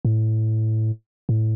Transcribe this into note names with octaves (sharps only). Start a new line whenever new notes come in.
A2
A2